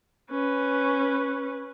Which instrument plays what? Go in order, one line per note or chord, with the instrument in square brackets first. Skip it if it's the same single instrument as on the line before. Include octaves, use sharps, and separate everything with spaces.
[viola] C#4 B4